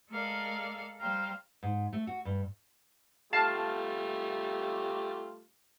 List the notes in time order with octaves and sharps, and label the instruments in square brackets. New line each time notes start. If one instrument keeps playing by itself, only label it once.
[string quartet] G#3 A4 A#4 D5 F5
G3 C5 F5 G5 A#5
[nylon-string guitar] G#2
A3
F#4
G2
[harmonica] G3 A3 F4 [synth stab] F5 A5